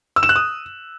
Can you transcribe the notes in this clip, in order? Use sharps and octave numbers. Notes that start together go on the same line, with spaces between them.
E6
E7
F#6
D#6